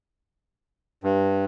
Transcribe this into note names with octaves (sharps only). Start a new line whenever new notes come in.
G2